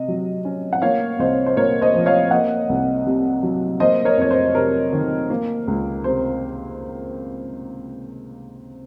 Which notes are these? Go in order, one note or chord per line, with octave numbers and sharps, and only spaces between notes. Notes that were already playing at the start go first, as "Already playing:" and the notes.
Already playing: C3 D#5
F#3
C#4
F#5
A#3 C#5 F5
C2 C5 D#5
C5
A#2 A#4 C#5
C5 D#5
F3
C#5 F5
A#3 D#5 F#5
C2
C3
F#3
A#3 C5 D#5
A#4 C#5
F2 C#5
C5
C3 A#4
D#3
A#3
C#2
C3 C5